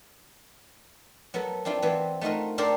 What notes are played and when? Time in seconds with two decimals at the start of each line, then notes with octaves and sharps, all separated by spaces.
1.34 F#3 B3 A4 A#4
1.65 C4 D4 E4 F4
1.82 E3 B3 C4
2.21 A3 D#4 F4 F#4 A#4
2.58 D4 G4 A4 A#4 C5 D5